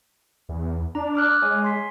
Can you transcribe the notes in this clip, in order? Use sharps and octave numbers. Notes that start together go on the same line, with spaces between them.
E2
D4 A#5
D6 F6 F#6
G#3 C#5 G#5
C6 B6